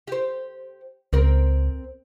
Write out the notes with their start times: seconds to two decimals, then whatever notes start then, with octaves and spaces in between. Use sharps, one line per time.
0.07 G4 C5
1.13 C#2 C4 A#4